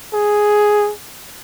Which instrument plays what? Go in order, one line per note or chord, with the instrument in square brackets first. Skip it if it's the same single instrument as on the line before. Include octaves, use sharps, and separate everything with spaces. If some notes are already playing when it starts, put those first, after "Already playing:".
[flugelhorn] G#4